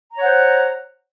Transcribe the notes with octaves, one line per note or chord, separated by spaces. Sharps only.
C5 C#5 F#5 A#5